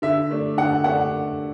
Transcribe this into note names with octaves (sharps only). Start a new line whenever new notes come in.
D3 E5
A3 D4
D3 F#5
A3 D4 F#5